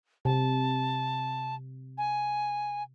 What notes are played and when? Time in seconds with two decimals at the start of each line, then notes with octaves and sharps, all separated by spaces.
0.25 C3 A5
1.98 G#5